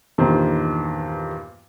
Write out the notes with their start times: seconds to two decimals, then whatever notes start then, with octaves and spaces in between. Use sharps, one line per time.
0.18 E2 G2 A#2 D#3 C5